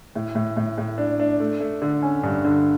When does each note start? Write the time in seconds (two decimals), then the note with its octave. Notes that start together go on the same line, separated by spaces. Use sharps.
0.15 A2
0.35 A2
0.57 A2
0.78 A2
0.98 D4
1.20 D4
1.40 A3
1.60 A3
1.82 D3
2.02 C#4
2.23 G2
2.44 D3